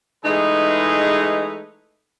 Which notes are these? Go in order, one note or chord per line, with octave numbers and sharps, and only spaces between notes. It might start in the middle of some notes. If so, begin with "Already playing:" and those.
E3 G#3 A3 D#4 G#4 B4